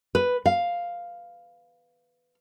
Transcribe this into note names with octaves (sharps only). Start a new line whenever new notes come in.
B4
F5